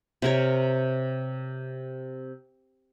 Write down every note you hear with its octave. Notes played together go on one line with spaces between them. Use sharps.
C3 A#4 C#5